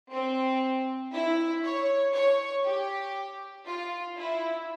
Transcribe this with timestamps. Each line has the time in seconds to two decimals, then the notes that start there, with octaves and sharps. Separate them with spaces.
0.10 C4
1.12 E4
1.63 C#5
2.13 C#5
2.65 G4
3.66 F4
4.17 E4